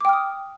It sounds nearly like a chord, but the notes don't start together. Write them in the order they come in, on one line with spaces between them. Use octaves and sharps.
D6 G5 F6 D#6